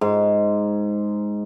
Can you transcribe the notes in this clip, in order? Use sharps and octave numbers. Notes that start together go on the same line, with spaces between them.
G#2